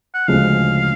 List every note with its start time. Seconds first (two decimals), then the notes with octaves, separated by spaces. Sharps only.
0.14 F#5
0.28 D2 C#3 F3 G#3 F5